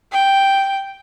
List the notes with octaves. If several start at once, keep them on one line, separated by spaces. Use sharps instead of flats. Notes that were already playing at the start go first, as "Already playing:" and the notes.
G5